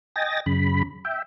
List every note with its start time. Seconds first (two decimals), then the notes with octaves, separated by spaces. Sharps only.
0.16 D#5 G5 G#5 A6 A#6
0.46 F#2 C#3 B5
1.05 E5 G5